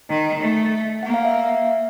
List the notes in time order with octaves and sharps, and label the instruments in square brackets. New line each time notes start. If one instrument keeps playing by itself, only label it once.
[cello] D#3
A3
[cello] A#3 [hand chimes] F#5
[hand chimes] F5
E5
F5